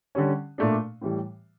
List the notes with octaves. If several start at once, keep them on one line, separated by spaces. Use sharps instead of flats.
D3 G3 C#4
A#2 A3 D4
A2 E3 G3